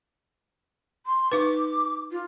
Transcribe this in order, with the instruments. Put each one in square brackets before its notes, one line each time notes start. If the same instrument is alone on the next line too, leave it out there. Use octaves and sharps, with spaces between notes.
[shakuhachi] C6
[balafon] D#4 B4 [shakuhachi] D6
[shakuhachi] F4